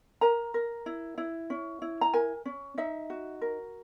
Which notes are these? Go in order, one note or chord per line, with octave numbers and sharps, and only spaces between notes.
A#4 A#5
A#4
E4
E4
C#4
E4
A#5
A#4 G#5
C#4
D#4 E5
F#4
A#4